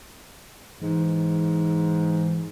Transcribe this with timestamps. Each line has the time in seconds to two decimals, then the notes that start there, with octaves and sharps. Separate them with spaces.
0.82 G#2 E3